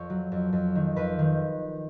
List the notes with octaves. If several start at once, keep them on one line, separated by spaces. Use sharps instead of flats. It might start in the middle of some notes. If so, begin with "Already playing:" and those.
Already playing: F2 C#5
F#3
F2
F2
D#3
F2 B4
D#3